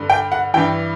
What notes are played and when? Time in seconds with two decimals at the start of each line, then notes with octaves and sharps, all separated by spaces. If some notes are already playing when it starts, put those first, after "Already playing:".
Already playing: G2 D3
0.10 G5
0.32 F#5
0.54 G2 E3 G5